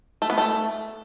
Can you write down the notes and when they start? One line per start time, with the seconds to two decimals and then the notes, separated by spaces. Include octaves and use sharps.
0.22 A3
0.30 B3
0.38 A3